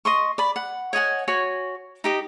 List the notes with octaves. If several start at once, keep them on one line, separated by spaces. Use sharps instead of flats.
D#5 C6 C#6
D5 B5
F#5
C#5 D#5 F#5 G#5
F#4 C#5 G#5
D#4 G4 D#5